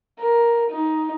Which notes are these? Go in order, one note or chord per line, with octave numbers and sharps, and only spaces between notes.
A#4
D#4